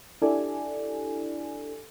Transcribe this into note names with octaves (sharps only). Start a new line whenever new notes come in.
D4 E4 G4 A4 D5 G#5